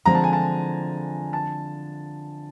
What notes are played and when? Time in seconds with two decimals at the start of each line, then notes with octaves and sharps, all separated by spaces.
0.05 D3 F3 G#3 C4 A#5
0.15 A5
0.24 G#5
0.33 A5
1.33 A5